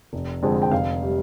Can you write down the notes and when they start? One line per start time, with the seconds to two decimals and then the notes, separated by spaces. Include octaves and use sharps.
0.13 F1
0.43 F2 D3 G#3 C4
0.62 G5
0.71 F1 F5
1.02 C3 G3